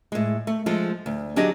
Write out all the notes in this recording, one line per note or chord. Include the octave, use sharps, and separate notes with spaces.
A2 G#3
A3
F3 G#3 A4
D2
F#3 D4 G4 G#4 D#5